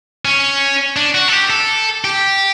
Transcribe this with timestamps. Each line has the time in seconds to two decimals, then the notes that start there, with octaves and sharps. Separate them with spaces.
0.25 C#4
0.96 D4
1.15 F#4
1.28 A4
1.33 G4
1.50 A4
2.04 G4